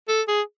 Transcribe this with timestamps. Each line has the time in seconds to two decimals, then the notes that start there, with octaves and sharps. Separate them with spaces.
0.08 A4
0.28 G#4